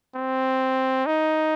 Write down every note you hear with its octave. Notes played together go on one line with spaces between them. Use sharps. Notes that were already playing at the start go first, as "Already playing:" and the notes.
C4
D#4